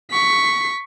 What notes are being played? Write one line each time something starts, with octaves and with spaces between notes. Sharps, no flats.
C#6 B6